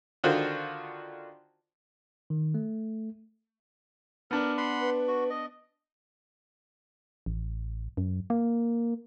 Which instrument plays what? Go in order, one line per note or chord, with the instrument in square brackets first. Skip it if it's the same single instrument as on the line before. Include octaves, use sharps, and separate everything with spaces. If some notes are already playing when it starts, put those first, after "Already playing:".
[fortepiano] D3 D#3 F4 F#4 C5
[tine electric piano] D#3
A3
[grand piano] B3 D4 [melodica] A#4
[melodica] F#5 B5 C6
[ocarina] B4
[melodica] F#4
D#5
[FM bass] A1
F#2
A#3